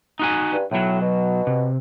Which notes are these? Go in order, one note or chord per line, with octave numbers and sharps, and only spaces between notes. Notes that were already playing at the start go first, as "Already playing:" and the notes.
D#4 F#4 G#5
G2
B1 A2 F#3
B2
C3